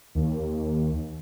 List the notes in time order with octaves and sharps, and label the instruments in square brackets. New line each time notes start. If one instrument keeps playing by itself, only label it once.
[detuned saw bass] D#2